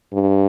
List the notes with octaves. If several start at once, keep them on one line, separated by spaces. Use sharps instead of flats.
G2